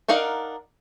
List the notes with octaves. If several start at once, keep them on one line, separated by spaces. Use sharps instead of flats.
D4 D#4 A#4 F5 F#5